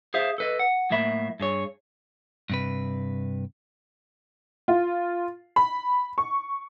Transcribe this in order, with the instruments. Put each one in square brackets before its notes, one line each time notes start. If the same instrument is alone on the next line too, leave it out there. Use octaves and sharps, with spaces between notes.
[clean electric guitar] G#4 C5 E5 F5
A4 B4 D#5
F#5
A2 F#3 A#3 E5 B5
G2 G#4 C#5
G2 C3 B4
[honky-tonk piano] F4
B5
C#6